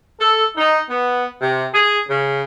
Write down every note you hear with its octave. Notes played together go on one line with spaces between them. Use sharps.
A4
D#4
B3
C3
G#4
C#3